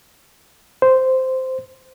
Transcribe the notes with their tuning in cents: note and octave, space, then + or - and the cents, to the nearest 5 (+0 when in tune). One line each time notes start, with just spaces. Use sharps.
C5 -10